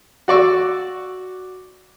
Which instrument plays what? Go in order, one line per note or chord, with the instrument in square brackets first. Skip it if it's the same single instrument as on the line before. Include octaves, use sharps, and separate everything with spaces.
[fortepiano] F#4 D5 C#6 E6